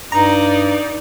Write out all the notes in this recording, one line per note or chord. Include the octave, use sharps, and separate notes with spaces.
G2 D#4 D5 A#5